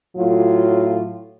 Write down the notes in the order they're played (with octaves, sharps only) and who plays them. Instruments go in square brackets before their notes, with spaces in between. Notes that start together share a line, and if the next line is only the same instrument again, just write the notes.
[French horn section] A2 F#3 F4